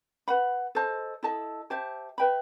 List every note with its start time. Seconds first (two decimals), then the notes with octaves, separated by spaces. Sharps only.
0.28 B4 F#5 B5
0.75 A4 C5 D#5 A5
1.23 E4 A4 D#5 A5
1.70 G4 C5 E5 A5
2.18 B4 E5 G5 B5